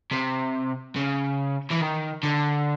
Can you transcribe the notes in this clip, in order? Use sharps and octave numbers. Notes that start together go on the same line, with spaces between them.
C3
C#3
E3
D#3
D3